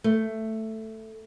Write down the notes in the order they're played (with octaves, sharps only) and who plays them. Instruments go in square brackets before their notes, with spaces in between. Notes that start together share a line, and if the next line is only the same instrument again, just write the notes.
[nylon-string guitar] A3